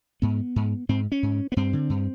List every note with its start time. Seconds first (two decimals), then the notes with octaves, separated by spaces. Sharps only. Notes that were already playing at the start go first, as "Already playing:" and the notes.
0.22 G#2 B3
0.56 G#2
0.89 G#2 C4
1.12 C#4
1.23 G#2
1.52 B3
1.57 G2 C4
1.73 D3
1.90 G2